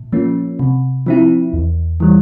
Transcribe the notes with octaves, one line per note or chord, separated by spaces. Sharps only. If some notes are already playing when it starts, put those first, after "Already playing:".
Already playing: A#2
F3 A#3 C#4
C3
F3 C4 E4
E2
E3 G3